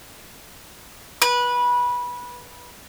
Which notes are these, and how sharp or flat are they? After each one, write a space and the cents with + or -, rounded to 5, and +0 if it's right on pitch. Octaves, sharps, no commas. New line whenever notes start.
B4 -20